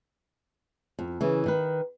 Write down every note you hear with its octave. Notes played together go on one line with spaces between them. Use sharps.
F2
C#3 E3
D#3 B4